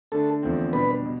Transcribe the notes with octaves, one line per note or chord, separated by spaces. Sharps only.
D3 A3 D4 A4
E2 D3 F3 A3 C4
B2 G3 D4 B4
B2